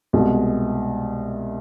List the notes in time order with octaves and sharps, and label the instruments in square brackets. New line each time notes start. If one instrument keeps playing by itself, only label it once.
[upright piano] C2 B2 G#3